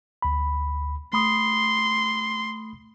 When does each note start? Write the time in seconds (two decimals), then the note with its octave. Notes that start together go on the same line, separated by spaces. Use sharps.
0.22 D2 B5
1.13 A3 B5 C6 D#6